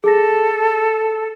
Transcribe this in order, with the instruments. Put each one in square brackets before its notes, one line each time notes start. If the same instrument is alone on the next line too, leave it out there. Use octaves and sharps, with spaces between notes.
[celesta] G#4 A#6 [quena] A4